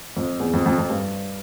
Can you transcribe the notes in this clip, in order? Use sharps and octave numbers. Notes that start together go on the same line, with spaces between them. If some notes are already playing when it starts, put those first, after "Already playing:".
F2
E2
F2
F2
F2
G2